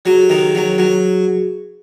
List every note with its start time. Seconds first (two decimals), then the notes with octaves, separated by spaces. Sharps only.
0.05 F#3 F#4 G#4
0.21 G4 A4
0.30 D#3
0.38 F#4 G#4
0.55 F#3
0.78 F#3